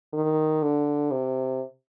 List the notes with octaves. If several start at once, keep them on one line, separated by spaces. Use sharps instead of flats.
D#3
D3
C3